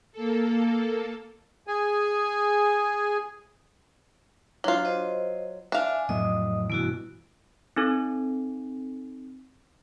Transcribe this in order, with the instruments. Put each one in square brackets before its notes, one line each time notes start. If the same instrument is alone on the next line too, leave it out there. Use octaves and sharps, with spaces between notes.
[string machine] A#3 A4
[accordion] G#4 G#5
[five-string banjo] F#3 F4 [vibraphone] D4
[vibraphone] C5 D#5
[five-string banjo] D4 F5 [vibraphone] E5 G#5
[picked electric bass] F2 A2 F#3 [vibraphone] D#5 D#6
[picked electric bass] G2 B2 E3 [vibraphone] A3 E4 F#4
[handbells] C4 D#4 A4